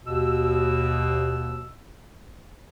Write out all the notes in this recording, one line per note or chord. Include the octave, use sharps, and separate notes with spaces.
D#2 B2 E6